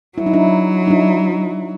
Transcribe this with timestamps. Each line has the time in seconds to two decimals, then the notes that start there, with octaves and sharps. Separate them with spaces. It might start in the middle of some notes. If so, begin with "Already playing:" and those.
0.18 F#3 E4
0.26 D#4
0.33 D4 E4
0.87 D#4
0.91 D4 E4